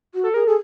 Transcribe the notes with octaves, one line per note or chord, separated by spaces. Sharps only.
F#4
A4
G#4 A#4
G#4 A4